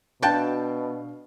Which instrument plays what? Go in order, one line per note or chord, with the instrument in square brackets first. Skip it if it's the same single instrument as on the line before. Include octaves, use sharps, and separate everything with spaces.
[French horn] B2 [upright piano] D4 F5 [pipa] F#4 G5 A5